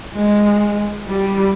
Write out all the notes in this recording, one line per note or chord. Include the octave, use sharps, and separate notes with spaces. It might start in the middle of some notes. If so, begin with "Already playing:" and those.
G#3
G3